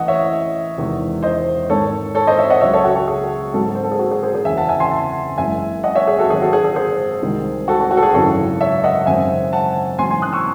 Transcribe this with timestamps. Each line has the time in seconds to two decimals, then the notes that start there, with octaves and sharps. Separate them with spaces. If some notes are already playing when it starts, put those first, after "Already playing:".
Already playing: A1 A2 E3 A3 D#5 F#5
0.08 C#5 E5
0.77 E1 E2 C3 D#3 G#3
1.23 C5 D#5
1.69 G#1 G#2 D#3 A4 C#5
2.15 A4 C#5
2.27 C5 D#5
2.38 C#5 E5
2.50 D#5 F#5
2.61 C#2 C#3 F#3 C#5 E5
2.73 A4 C#5
2.84 F#4 A4
2.95 F#4
3.08 G#4
3.53 G#2 F#3 C4 F#4 A4
3.75 C5
3.84 A4
3.92 G#4
3.99 F#4
4.11 G#4
4.23 G#4 C5
4.34 G#4 C5
4.45 F#1 E2 C#3 E5 G#5
4.57 F#5 A5
4.69 E5 G#5
4.80 G#5 C6
4.91 F#5 A5
5.38 F#1 F#2 E3 G#3 E5 G#5
5.84 D#5 F#5
5.95 C#5 E5
6.08 G#4
6.19 F#4 A4
6.30 G#1 G#2 F#3 C4 G#4
6.41 F#4 A4
6.53 G#4
6.65 G#4
6.76 G#4 C5
7.22 C2 C3 D#3 G#3 C4
7.68 F#4 A4
7.80 F#4
7.91 F#4
7.97 A4
8.03 G#4
8.14 G#1 F#2 C#3 E3 G#3 F#4 A4
8.61 C#5 E5
8.84 D#5 F#5
9.06 G#1 F#2 C#3 G#3 C4 E5 G#5
9.53 F#5 A5
9.99 A1 G#2 F#3 G#5 C6
10.10 G#5 C6
10.22 D#6 F#6
10.33 C#6 E6